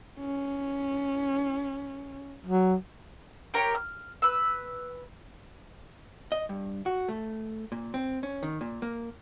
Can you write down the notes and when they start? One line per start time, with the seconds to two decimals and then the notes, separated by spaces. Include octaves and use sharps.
0.20 C#4
2.46 F#3
3.54 G4 A#4 C#5 G5
3.75 F6
4.22 B4 E6
6.32 D#5
6.49 G2
6.86 F#4
7.08 A3
7.72 A#2
7.94 C4
8.23 C#4
8.43 D#3
8.61 A#2
8.82 A#3